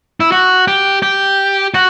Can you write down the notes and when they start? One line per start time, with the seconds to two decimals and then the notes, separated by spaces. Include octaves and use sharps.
0.20 E4
0.32 F#4
0.68 G4
1.02 G4
1.74 F#4